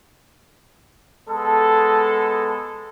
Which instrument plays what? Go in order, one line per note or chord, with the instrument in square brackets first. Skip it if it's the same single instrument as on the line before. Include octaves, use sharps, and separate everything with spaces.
[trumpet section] G#3 B3 A4